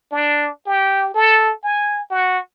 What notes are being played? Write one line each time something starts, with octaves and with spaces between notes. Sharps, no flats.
D4
G4
A4
G#5
F#4